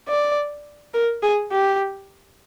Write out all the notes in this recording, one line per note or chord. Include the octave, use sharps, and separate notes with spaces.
D5
A#4
G#4
G4